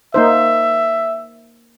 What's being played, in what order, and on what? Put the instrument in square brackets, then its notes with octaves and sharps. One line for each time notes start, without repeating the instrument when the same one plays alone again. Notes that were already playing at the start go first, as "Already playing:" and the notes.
[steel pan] A#3 D#4 C5 [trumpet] E5